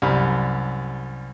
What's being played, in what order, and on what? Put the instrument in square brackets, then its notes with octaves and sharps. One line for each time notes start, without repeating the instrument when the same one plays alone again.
[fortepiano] C2 F#2 G3